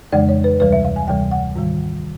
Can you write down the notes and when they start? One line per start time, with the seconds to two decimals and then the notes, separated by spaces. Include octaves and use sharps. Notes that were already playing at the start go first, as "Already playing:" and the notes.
0.12 F2 C#3 E3 G#3 D5
0.29 C#5
0.44 B4
0.60 D2 C3 E3 G3 B4
0.72 E5
0.85 F5
0.96 G#5
1.08 D2 C3 E3 G3 G5
1.31 F#5
1.56 G#2 D#3 G3